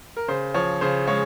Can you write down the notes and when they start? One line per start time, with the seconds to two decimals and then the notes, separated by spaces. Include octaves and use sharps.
0.17 A#4
0.28 C#3 C5
0.54 F3 C#5
0.81 C#3 C5
1.07 G#3 C#5